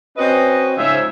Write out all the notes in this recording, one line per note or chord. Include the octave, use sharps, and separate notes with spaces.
C4 C#4 F#4 B4 D#5
G#2 C#3 F3 C#4 E5